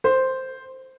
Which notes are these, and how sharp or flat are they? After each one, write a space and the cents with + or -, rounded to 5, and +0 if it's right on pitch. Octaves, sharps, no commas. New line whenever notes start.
C5 +0